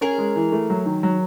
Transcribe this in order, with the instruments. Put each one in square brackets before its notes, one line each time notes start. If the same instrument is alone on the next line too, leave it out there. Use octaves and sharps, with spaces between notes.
[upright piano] C#4 [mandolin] G#4 A#4
[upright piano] G#3
E3
A3
F#3
D#3
F#3